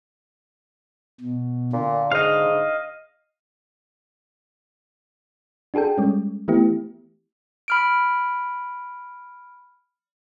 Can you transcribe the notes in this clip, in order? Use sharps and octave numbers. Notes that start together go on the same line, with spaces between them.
B2
A#2 D3
G#2 D#5 F5
D4 F#4 G#4 A4 G5
G3 G#3 C#4
E3 A3 B3 E4 G4
B5 F6 D7